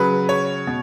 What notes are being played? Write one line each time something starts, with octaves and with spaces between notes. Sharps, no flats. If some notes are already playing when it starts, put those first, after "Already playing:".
Already playing: C#3 F#3 B4
C#5
B2